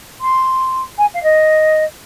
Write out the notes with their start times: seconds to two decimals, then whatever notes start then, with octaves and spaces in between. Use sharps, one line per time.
0.21 C6
0.98 G#5
1.14 F5
1.23 D#5